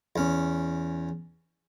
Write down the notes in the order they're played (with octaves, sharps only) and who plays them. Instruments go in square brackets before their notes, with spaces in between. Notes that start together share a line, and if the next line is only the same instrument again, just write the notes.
[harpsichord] E2 C#4